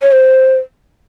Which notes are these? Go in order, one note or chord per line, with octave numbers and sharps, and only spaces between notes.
C#5
C5